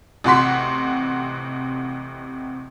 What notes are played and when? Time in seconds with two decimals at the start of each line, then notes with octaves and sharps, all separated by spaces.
0.24 A1 C3 F#4 F#5 C6 B6